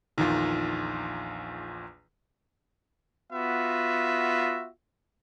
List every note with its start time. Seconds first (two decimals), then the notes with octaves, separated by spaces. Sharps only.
0.18 A#1 E2 D#3 F4
3.33 B3 F4 F#4 E5